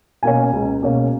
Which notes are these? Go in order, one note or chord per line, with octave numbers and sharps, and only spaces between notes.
B2 A#3 C#4 G#5
C#2
B2 A#3 C#4